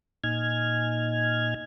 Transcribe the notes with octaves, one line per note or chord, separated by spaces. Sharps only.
A#2 D#4 G#5 F6 G#6